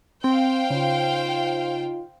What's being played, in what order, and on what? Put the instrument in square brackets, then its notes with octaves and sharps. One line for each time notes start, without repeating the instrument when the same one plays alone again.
[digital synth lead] C4 [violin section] C5 F5 G5
[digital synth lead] C#3 [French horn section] D#4 F4